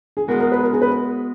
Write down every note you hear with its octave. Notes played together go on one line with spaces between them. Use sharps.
G#4
G#3 B3 F#4 A#4
A#4
B4
A#4
G#4
B4